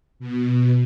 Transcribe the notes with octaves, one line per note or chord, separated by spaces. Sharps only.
B2